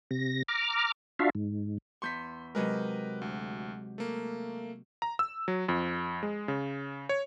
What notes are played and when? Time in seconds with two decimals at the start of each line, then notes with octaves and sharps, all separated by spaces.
0.11 C3 A#6
0.48 A#5 D6 F6
1.19 D4 F4 F#4 E5 F5
1.35 G#2
2.02 E2 C6 C#6 G6 B6
2.55 C3 F#3 G#3 A#4 B4 D#5
3.22 D2
3.98 A3 A#3
5.02 A#5
5.19 E6
5.48 F#3
5.69 F2
6.23 G#3
6.48 C#3
7.09 C#5